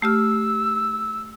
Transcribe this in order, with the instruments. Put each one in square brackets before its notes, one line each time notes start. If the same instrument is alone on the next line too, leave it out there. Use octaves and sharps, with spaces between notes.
[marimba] A3 G4 F6 [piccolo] E6